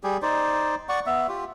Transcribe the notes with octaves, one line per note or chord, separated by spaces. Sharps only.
G3 G4 G#4
D#4 C5 D5
D5 F#5 C#6
B3 E5
F4 G4